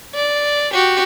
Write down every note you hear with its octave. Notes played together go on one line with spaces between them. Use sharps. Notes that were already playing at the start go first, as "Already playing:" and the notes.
D5
F#4 G4